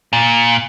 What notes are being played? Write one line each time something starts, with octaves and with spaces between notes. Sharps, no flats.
A#2